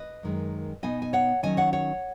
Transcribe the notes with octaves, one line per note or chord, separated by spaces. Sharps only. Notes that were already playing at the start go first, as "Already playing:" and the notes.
Already playing: B4 D#5
F#2 D#3 G#3
B2 B3 D#4 D#5 G#5
G#5
C#5 F#5
D#3 F#3 C#4 D#5 G#5
C#5 F#5
C#5 F#5